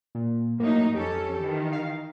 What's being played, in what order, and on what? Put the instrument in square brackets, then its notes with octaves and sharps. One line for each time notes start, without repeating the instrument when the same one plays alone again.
[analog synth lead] A#2
[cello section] A2 F#3 D#4 [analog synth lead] A#3
[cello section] F2 C#4 A4 [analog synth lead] G4
[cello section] D#3 E3
[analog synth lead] F5